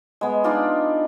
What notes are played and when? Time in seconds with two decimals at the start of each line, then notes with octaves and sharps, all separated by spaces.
0.21 G#3 B3
0.44 D4 D#4 F4 D5